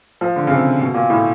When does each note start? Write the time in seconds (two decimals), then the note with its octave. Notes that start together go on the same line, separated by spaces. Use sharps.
0.21 F3
0.36 D3
0.47 C#3
0.51 C3
0.81 B2
0.94 A#2
1.10 A2